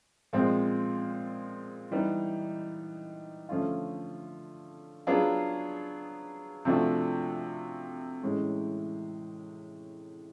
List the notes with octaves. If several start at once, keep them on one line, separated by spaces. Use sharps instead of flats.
A#2 F3 G#3 C4
E3 G3 B3 D#4
D3 F3 A3 C#4 F4
F#3 B3 D4 F4 G#4
C3 F3 A3 D4 F#4
A2 E3 G#3 C#4